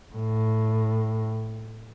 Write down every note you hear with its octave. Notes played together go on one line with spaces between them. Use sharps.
A2